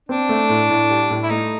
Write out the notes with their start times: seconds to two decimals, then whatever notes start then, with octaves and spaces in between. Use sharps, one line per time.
0.09 C4 D4
0.29 A3
0.49 A2
0.69 A2
0.90 G3
1.10 A2
1.24 E4
1.30 A3 D#4